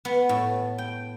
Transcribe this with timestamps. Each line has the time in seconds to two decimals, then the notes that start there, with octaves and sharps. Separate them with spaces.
0.05 B3
0.29 A2
0.78 G5